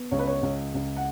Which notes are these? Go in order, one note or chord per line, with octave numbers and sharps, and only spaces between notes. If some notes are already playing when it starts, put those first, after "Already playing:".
Already playing: B3
C#2 C#5
B4
C#5
C#2
C#2
F#5